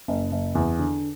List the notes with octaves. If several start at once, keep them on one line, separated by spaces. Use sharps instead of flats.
F#1
F#1
E2
D3